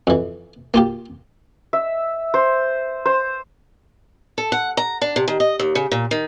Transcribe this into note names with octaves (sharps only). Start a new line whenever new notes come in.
F2 E3
A#3 F4 G4
E5
C5
C5
A4
F#5
A#5
D4
C3
D#3
D#5
D#2
C#3
A#2
D#3